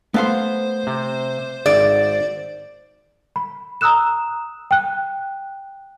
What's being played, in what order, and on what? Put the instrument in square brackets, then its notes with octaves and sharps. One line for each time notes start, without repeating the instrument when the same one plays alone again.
[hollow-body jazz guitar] A3 F5 C6 [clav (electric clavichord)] B3 [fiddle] C5
[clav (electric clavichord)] C3
[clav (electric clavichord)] G#1 [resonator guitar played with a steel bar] D5
[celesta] B5
A#5 D#6 E6 F#6 E7
G5 F#6